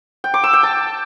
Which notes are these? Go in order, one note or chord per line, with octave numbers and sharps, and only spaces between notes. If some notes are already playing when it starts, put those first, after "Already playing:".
G5
D6
E6
G5
A5